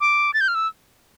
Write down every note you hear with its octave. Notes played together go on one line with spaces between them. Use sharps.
D6
A6
G6
F6
E6